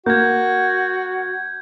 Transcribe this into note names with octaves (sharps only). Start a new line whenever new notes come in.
A#3 F#4 G6 G#6